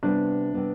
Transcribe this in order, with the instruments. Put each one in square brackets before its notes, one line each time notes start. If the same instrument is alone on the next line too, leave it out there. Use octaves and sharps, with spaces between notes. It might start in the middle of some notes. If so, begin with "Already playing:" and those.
[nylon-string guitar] C3 G3 B3 [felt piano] D4
[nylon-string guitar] C3 G3 B3